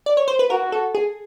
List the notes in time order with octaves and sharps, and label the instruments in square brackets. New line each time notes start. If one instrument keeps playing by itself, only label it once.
[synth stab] D5
C#5
C5
B4
[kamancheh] F#4 [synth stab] A#4
[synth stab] A4
G#4